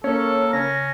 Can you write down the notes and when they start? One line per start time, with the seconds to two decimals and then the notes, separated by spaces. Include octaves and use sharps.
0.04 A#3 C#4 A4 C#5
0.53 C#3 C#4 A#6